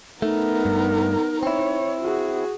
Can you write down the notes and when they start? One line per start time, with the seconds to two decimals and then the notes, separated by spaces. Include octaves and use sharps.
0.22 A3 B3 D#4 A#4
0.65 G2 A3
1.43 C4 E4 C#5
2.01 F#4 G#4